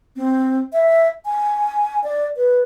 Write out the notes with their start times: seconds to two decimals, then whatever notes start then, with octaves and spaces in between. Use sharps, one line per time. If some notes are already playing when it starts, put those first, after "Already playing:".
0.16 C4
0.73 E5
1.25 G#5
2.04 D5
2.36 B4